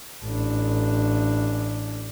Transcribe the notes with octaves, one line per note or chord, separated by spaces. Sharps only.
A1 D4